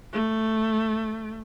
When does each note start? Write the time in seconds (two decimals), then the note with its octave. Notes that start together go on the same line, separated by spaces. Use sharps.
0.13 A3